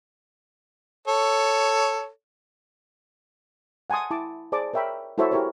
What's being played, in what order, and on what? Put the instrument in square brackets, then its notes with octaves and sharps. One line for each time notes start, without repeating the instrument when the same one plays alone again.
[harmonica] A4 C#5
[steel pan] F#5 G#5 A5 C6 D#6
E4 A5 D6
G#4 C5 D5 A5 D6
A#4 C#5 E5 G5 B5
E4 F#4 A4 C5 C#5 E5
E4 G4 G#4 A#4 C5 C#5